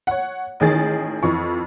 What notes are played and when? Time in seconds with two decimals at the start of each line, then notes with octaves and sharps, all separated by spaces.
0.07 C#5 F#5
0.60 A1 D#3 G#4 A6
1.23 F2 E3 C#6